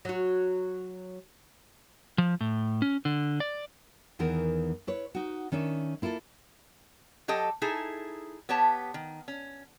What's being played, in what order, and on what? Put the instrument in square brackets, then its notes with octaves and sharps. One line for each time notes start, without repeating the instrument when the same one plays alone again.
[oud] F#3 F#4
[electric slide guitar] F3
A2
C#4
D3
D5
[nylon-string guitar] E2 D#3 E3 B3 A#4
E4 B4 C#5
D#4 F#4
D#3 C#4 D4 E5
A#3 E4 F4 G#4 A4
[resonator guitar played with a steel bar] F#3 G4 A4 D#5
D#4 E4 G#4 A4
B3 G4 C#5 A5
D#3
C#4